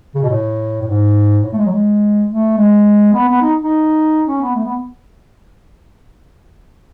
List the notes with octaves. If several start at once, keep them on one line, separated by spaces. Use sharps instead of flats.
C#3
B2
A2
A2
G#2
A2
A3
G#3
F#3
G#3
A3
G#3
B3
B3
D#4
D#4
C#4
B3
A3
B3